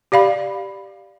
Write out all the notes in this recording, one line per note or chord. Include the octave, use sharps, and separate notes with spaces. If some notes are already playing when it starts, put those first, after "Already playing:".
G4 D5 F5 B5